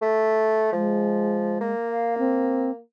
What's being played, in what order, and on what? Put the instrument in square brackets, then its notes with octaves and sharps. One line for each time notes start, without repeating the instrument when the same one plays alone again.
[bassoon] A3
[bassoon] F3 [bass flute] G#3
[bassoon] A#3
[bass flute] F5
C4